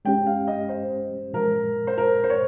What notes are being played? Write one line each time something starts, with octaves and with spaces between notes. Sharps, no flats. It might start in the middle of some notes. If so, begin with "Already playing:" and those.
G#3 C#4 G4 G5
F5
D#5
C5
A#2 F3 G#3 A#4
C5
A#4
C5
C#5